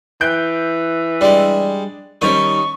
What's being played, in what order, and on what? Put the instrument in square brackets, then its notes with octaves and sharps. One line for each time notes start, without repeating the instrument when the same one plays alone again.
[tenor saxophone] E3 [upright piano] F#6 G6 D7
[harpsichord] G3 G#3 [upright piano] D4
[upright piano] D#3 G3 C#4 [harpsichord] D#4 [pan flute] C#6